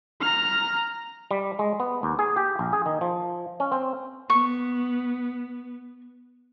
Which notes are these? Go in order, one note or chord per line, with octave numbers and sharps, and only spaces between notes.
A#5 F6
G3
G#3
B3
D#2
G#4
G4
A#1
G#4
D#3
F3
C#4
C4
B3 C#6